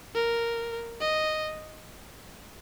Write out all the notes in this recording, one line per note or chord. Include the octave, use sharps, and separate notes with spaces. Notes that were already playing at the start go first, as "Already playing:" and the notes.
A#4
D#5